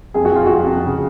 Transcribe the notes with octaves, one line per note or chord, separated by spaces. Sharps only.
F2 G#4
F#4
F2 F4
F2 F#4
F2
C#3